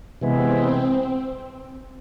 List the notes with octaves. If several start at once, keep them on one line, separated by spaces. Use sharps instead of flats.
C3 E3 G#3 B3 C4